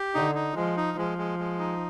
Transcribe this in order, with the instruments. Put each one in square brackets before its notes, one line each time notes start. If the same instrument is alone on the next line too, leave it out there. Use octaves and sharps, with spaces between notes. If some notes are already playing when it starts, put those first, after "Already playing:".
Already playing: [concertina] G4
[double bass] D3 [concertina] D#4
[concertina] D#4
[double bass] F3 [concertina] G#3
[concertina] D#4
[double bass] F3 [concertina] G#3
[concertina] G#3
G#3
D#4